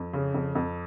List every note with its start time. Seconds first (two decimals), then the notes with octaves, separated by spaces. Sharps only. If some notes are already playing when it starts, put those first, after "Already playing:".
Already playing: F2
0.13 C#3
0.34 F2
0.55 F2